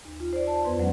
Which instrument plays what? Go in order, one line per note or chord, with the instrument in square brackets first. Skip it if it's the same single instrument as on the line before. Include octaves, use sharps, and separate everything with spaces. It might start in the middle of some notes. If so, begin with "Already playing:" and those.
[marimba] D#2
F4
C5 D5
A5
F2 B3 B4 C6
E2 F#3 G#3 C#4 F#5